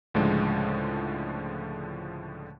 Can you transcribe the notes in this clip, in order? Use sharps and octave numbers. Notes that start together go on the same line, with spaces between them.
C#2 A2 D3 F3 G#3